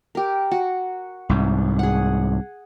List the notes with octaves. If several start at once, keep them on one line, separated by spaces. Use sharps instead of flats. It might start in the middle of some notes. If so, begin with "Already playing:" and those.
G4 A#4
F#4
C2 G#2
G#4 F#5